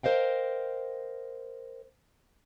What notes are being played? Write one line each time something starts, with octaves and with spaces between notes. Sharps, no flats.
A#4 C5 D#5 F5 G5